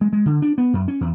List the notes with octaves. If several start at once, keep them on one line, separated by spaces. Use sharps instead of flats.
G#3
G#3
D3
D4
B3
F#2
C#4
E2